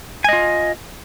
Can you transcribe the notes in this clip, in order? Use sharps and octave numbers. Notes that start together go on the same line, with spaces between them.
F4 D#5 G#5